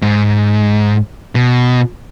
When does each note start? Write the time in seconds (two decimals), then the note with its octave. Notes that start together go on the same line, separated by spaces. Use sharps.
0.02 G#2
1.35 B2